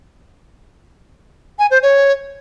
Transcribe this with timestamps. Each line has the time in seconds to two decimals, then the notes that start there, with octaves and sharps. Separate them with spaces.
1.59 G#5
1.71 C5
1.83 C#5